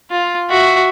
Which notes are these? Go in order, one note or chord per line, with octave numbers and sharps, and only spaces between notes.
F4
F#4 E5